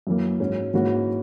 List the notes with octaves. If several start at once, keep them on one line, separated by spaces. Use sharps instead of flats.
F#2 E3 A#3
G#2 F#3 C#4 F#4
G#2 E3 A#3 C#4 F#4